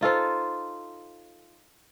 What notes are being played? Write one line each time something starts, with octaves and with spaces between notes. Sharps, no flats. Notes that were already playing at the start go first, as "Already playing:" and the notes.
D#4 F4 A4 C5